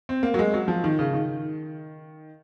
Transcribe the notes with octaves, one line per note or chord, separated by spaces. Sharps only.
C4
A#3
F#3
G#3
F#3
F3
D#3
C#3
D#3